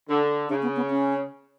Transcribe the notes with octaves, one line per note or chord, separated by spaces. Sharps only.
D3 D4
C#3 D4
B3
B3
C#4